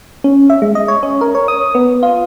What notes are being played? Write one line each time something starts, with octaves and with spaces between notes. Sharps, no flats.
C#4
E5
G#3
D#5
C#5
C#4
A#4
C#5
D#6
B3
F4